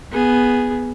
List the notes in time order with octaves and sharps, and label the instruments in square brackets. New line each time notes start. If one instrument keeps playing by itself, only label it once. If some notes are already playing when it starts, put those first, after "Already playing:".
[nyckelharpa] B3 G#4